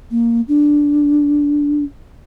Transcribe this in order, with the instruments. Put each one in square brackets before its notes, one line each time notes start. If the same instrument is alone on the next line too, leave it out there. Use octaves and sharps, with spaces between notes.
[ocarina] A#3
D4